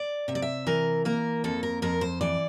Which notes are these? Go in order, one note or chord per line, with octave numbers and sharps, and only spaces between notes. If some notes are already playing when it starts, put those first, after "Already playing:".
Already playing: D5
C3 E5
D5
E5
E3 A#4
A#3 A#4
F2 A4
A#4
F2 A#4
C5
E3 D5